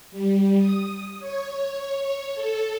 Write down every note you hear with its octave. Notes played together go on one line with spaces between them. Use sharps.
G3
D#6
C#5
A4